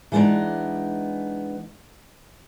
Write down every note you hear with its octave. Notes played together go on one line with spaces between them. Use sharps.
E3 G#3 B3 D4 D#4